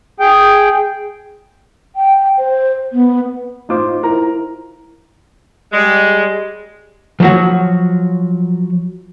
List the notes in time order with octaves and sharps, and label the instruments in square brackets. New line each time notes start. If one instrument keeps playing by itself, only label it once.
[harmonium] G#4 G5
[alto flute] G5
C5
B3
[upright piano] A2 D6 [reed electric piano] D#4 F4 C5
[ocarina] E4 [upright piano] A#4 A#5
[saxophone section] G3 G#3
[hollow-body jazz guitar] F3 F#3 F#4